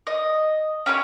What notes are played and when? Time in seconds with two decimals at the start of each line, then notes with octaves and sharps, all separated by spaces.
0.07 D#5
0.86 C#4 G4 B4 C#5